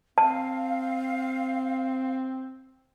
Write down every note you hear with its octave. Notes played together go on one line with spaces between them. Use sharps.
C4 F5 A5